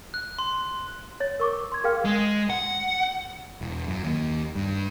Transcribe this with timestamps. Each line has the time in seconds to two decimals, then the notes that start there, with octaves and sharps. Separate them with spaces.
0.14 F#6
0.39 C6
1.20 C#5 A6
1.40 A#4 C#6 D6
1.72 C6 G#6
1.84 G#4 A#4 F5 G5 F6
2.05 G#3
2.50 F#5
3.61 E1
3.88 F#2
4.04 D#2
4.55 G2